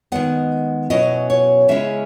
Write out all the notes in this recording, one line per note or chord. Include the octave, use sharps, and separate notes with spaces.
D#3 G#3 B3 F#5
B2 F#3 C#4 E4 D#5
C#5
C#3 G#3 C#4 E4 E5